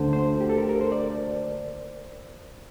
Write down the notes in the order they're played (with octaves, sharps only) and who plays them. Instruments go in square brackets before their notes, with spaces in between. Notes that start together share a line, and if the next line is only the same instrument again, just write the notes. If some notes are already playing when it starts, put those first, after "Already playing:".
Already playing: [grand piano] D2 D3 A3 [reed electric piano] C5
[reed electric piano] C5
G4
A4
A#4
A#4
C5
D5